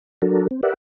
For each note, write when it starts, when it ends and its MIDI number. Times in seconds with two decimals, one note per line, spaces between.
0.22 0.47 54
0.22 0.47 62
0.22 0.47 66
0.22 0.47 69
0.22 0.47 70
0.51 0.61 60
0.63 0.74 67
0.63 0.74 70
0.63 0.74 71
0.63 0.74 74
0.63 0.74 76
0.63 0.74 78